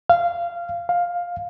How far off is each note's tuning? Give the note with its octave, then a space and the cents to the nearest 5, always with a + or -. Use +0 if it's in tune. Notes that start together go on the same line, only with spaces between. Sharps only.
F5 -15
F5 +10